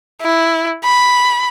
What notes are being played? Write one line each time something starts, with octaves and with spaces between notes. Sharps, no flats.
E4
B5